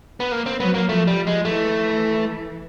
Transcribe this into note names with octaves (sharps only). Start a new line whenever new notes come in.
B3
A#3
C4
F#3 B3
A#3
F3 A3
G3
G#3
E3 A3